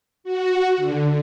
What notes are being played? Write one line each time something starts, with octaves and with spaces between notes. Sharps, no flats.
F#4
D3